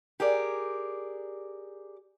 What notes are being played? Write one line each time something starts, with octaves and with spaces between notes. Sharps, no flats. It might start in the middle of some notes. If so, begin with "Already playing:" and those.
G4 G#4 A#4 D5